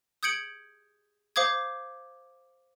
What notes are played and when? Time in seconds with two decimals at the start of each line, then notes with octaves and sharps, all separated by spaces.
0.23 D#6 G6 G#6 C#7 D7 F#7
1.36 C5 F5 D6 D#6 G#6